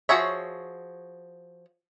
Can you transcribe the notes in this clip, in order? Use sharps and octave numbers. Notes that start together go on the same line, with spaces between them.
F3 F#4 G#4 C#5 E5